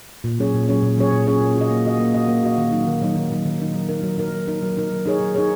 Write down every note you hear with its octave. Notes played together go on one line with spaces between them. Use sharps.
A#2
F#3 C#4 G#4 C#5
A#2
F#3 C#4 G#4 C#5
A#2
F#3 C#4 G#4 C#5
A#2
F#3 C#4 G#4 C#5
A#3
F#4
D#5
A#3
F#4 D#5
A#3
F#4 D#5
A#3
F#4 D#5
D#3
F#3 D#4
D#3
F#3 D#4
D#3
F#3 D#4
D#3
F#3 D#4
F#3
D#4 A#4
F#3
D#4 A#4
F#3
D#4 A#4
F#3
D#4 A#4
F#3
D#4 G#4 C#5
F#3
D#4 G#4 C#5